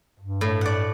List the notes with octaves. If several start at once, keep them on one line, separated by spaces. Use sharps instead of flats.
G2
A2
D5 F#5